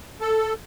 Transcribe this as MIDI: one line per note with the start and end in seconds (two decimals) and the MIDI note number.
0.21 0.54 69